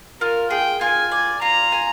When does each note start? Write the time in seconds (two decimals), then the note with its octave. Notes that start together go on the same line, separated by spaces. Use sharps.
0.21 F4 A#4
0.50 G#4 G5
0.81 F4 G#5
1.11 D5 G#5
1.42 F4 A#5
1.72 G#5